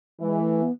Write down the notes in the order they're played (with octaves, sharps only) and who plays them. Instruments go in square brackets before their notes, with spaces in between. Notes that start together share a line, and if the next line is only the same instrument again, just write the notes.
[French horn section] E3 [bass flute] G#3
[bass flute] A3
B3